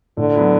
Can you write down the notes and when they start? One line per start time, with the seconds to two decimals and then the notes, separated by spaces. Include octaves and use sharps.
0.17 A2 D3
0.35 F#3 B3 E4